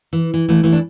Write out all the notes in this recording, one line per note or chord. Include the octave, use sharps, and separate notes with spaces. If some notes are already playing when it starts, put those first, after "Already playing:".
E3
E3
E3 A3
E3 A3
D4